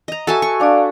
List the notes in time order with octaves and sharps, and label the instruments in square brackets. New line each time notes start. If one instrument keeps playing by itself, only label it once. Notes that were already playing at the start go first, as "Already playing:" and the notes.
[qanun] D#5 A#5
[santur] F#4 E5 [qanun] A4 G#5 A5
[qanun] C#6
[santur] D4 A4 [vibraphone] D5 F5